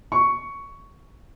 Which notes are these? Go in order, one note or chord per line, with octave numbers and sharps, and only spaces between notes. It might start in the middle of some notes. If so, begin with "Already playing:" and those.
C#6